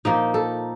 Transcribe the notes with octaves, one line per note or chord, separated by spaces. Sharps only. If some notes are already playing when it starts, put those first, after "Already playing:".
A#2 F3 A#3 D#4
A4